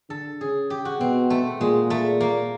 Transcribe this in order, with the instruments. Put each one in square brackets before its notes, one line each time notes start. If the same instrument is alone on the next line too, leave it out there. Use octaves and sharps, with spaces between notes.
[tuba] D3 [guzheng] A4
[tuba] C#3 [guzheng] G#4
[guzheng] G4
F#4
[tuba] B2 [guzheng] C4
[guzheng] A3
[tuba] A#2 [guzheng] G#3
[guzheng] A3
A#3